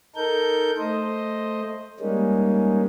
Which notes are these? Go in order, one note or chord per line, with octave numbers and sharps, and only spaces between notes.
D#4 A4 A#4 G6
A3 C5 D#5
G3 G#3 A#3 C#4 D#4